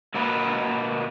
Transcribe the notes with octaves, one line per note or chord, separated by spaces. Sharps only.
B2 A#3 A#4 B4